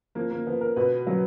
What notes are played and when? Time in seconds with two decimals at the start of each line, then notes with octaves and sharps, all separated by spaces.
0.15 F3 A#3
0.31 A#3
0.46 F3 B3
0.61 A#4
0.76 B2 B4
1.07 F#3